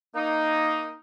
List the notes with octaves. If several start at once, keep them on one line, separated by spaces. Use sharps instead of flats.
A#3 D#4